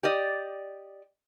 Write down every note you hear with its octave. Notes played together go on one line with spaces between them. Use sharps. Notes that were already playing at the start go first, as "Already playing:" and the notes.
G4 D5 D#5